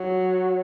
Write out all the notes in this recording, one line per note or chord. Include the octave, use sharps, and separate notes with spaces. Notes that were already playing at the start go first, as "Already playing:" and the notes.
Already playing: F#3